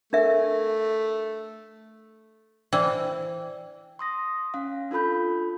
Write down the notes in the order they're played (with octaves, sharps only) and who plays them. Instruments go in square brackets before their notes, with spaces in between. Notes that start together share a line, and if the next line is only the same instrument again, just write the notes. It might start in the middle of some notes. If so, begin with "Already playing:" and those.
[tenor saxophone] A3 [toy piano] D4 A#4 E5
[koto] E3 [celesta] C5 D5 G5
[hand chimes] C6 D#6 A#6
C#4 F5
D4 F4 A4 B5 G6